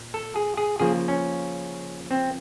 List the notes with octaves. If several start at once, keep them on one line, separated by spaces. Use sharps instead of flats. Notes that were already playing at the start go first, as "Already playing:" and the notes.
Already playing: A#2
A4
G#4
G#4
C#3 F3 A#3 G#4
C#4
C4